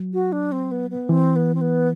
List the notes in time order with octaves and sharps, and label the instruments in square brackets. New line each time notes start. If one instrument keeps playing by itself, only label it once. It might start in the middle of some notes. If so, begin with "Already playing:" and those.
Already playing: [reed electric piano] F#3
[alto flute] F#4
D4
C4
B3
B3
[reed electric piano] E3 [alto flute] C4
[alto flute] B3
C4
B3